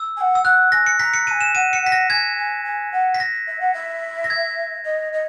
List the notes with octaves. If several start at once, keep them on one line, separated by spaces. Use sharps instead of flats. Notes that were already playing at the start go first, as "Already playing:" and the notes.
Already playing: E6
G#5
F#5
E6
F#5 F#6
G#5 A#6
C#7
A#5 B6
C#7
G#5 A#5 D#7
E7
F#5 D#7
C#7
F#5 B6
A#6
G#5 G#6
G#5
G#5
F#5
B6
A#6
E5
F#5
E5
A#6
G#6
D#5
D#5